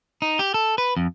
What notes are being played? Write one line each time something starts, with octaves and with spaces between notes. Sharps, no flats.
D#4
G4
A4
B4
F2